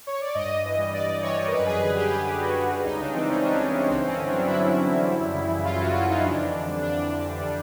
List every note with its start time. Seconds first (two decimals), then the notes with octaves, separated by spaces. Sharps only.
0.07 C#5
0.21 D5
0.34 G2 D#5
0.50 G2
0.65 E3
0.78 G3
0.93 G2 D5
1.07 G2
1.22 E3 C#5
1.37 G3 C#5
1.47 A#4
1.52 F#2 B4
1.66 F#2 G#4
1.81 D3 G#4
1.96 G3 G4
2.10 F#2 G4
2.26 F#2
2.40 D3 F#4
2.55 G3
2.70 G3
2.84 C#2 D#4
2.99 C#3 D4
3.14 E3 C4
3.28 G3 C#4
3.41 C#2 D4
3.55 C#3 C#4
3.73 E3
3.84 C#4
3.88 G2 C4
4.03 G2 C#4
4.16 D3
4.28 F#3 D4
4.46 G2 E4
4.62 G2
4.76 D3
4.90 F#3
5.05 G3
5.20 F#2
5.34 C#3
5.49 E3
5.65 G3 F4
5.79 F#2 F#4
5.94 C#3 F4
6.09 E3 D#4
6.23 F2 D4
6.37 F2
6.52 D3
6.67 G3
6.82 F2 D4
6.96 F2
7.11 D3
7.27 G3
7.41 G3